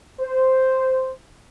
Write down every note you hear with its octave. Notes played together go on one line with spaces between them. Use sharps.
C5